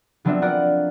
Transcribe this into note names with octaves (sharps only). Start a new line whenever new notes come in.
F3 F#3 B3 C4 D4 E5
F4 A#4 D5 F#5